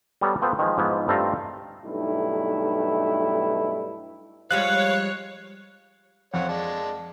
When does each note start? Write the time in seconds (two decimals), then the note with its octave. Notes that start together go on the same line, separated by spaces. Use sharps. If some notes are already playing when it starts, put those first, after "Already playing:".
0.21 G3 B3 A4 C#5 A5 A#5
0.42 B3 F4 A4 B4 C5 G5
0.59 D#3 F3 G#3
0.78 G#2 F3 B3 E4
1.08 G2 A3 C4 F4 A5 A#5
1.85 B1 G2 A3 D#4 E4
4.51 F3 G3 G#3 C#5 F5 F#6
6.34 F2 C5 C#5 F#5
6.48 G#3 D5 A5